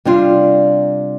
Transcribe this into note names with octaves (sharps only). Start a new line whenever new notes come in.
C3 G3 D4 F4